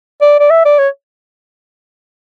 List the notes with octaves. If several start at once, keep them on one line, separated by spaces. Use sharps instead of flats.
D5
D5
E5
D5
C#5